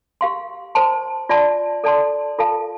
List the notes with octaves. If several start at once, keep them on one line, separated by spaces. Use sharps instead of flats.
G4 F5 C6
C5 A5 C6
F4 D5 A5 C6
A4 D5 A5 C6
F4 A4 F5 A5